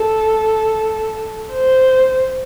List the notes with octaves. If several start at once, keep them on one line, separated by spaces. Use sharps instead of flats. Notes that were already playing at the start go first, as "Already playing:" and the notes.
Already playing: A4
C5